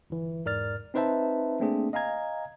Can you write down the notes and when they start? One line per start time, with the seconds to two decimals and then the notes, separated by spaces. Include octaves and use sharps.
0.10 G1 E3
0.45 E2 G#2 A#4 D5 F6 A6
0.94 C4 D#4 B4 C5 E5 A5
1.60 A3 A#3 C4 D4 G#4
1.93 D#5 F5 G#5 A#5 G#6